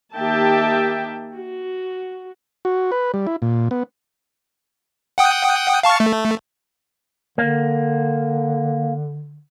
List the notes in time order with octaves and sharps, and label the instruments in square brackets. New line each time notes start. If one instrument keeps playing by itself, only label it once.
[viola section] D#3 A#3 G4 E5 G5 A5
F#4
[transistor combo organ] F#4
B4
G3
E4
A#2
B3
[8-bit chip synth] F#5 G5 D#6
F5 A5 C#6
A3
[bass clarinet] D3 [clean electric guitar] A#3